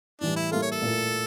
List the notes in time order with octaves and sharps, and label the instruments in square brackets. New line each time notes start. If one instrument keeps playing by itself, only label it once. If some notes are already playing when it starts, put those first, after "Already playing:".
[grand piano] A2 E3 G3 [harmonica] D4
[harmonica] E4
[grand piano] G3 A#3 E4 A4 [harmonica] F4
[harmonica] C#5
A4
[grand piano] A#2 A3 E4 A#4